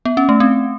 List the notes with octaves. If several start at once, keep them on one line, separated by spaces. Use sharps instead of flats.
B3
C#4
A3
C4